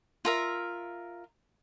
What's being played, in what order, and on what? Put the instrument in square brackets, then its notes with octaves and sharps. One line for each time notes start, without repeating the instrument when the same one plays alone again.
[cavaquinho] F4 A#4 E5